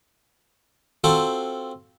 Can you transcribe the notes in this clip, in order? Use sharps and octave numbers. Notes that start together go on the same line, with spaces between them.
C4 F4 F#4 A4 C5